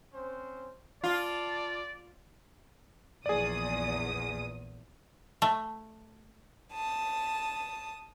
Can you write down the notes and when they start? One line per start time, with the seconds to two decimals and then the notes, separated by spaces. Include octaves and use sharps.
0.13 C4 C#4 C5
1.04 F4 D5 A5
3.26 A#1 E2 G#4 D5 D#6
5.42 A3
6.73 A5 D#6